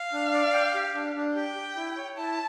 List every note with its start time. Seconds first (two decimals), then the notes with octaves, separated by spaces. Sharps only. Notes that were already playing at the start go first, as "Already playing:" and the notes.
Already playing: F5
0.13 D4
0.33 D5
0.54 G5
0.75 G4
0.94 D4
1.15 D4
1.35 G4 G5
1.56 G4
1.76 E4
1.96 C#5
2.17 E4 A5